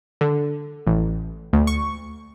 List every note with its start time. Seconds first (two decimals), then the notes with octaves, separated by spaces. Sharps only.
0.21 D3
0.87 A1
1.53 D2
1.67 C#6